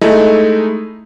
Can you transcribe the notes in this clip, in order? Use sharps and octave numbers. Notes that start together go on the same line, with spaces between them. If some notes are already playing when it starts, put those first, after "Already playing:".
G#3 A3 D#4 E4